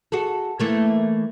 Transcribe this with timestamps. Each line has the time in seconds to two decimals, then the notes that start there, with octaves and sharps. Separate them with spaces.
0.12 F#4 G#4 A4
0.60 E3 A3 A#3